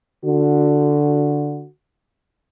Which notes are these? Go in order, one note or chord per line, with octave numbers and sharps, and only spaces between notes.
D3 F#4